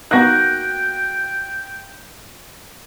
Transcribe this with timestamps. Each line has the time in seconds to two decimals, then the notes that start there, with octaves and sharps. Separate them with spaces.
0.11 A#3 B3 D#4 F#4 G5 A#5 F#6 A#6